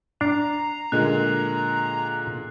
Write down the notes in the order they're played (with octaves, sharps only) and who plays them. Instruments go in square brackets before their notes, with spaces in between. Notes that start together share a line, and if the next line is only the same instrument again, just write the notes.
[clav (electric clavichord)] D4 [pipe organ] A#5 [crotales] C7
[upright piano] A#2 D3 G#3 [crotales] F#6